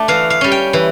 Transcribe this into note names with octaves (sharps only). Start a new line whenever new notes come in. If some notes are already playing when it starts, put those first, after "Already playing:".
Already playing: A3 D4
E3 F5
F5
G3 C#4
G5
E3